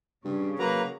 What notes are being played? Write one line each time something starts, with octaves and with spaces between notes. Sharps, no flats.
G2 C#3
F#3 A#3 B4 A#5